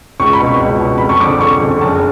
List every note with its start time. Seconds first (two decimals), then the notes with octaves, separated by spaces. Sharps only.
0.20 C#2 C#6
0.33 B5
0.40 B2
0.46 C#6
0.60 C#2
0.80 B2
0.98 F1 B5
1.09 C#6
1.21 F2 D3 D6
1.41 F1 C#6
1.61 F2 D3
1.81 F#1 A5